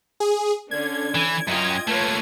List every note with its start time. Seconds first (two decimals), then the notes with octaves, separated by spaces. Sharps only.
0.20 G#4
0.71 D3 C#4 D4 G#6
1.15 E3
1.48 F#2 C#4 F4 D#5 G5
1.87 A3 A#3 F4 B4 C#5